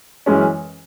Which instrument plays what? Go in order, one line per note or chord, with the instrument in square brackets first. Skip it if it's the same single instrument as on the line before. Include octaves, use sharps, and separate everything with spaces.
[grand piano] F#2 E3 G#3 C#4